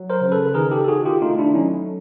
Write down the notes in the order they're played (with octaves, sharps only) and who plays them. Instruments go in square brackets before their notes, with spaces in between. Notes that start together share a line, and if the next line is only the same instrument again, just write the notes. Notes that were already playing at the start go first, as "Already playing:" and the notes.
Already playing: [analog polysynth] F#3
[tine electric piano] A#4 C5
[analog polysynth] C#3
[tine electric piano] A4 B4
[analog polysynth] D#3 [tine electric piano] G#4 A#4
[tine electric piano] G4 A4
A4
[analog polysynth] D#3 [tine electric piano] F#4 G#4
[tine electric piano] F4 G4
[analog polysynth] A3 [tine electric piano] D#4 F4
[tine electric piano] D4 E4
[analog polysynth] F#3 [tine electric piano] C#4 D#4